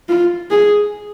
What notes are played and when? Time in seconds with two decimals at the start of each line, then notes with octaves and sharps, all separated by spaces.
0.09 F4
0.51 G#4